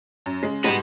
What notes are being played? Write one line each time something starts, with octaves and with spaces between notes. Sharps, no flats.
F#2
C#3 G#3
G#2 G3 G#3 F#4 B4